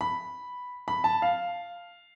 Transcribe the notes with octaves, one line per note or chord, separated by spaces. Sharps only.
B5
B5
A5
F5